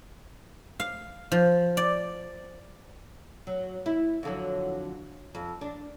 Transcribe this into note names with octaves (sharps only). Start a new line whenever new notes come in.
F5
F3
D5
F#3
E4
F2 D3 F#3
F2
D4